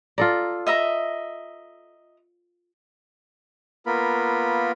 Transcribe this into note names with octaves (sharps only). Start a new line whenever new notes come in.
F4 A4 D5 A#5
D#5 E5 A#5
A#3 B3 F4 A#4 B5